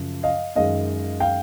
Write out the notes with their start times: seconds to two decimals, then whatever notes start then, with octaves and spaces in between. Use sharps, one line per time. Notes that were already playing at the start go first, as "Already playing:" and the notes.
Already playing: F#2 C#3 F3
0.23 D#5 F5
0.56 F#2 D#3 G#3 D#5 F5
1.20 F5 G5